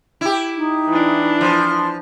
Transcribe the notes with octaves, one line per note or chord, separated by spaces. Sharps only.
E4 G4
D#4
E3 D4
F3 C6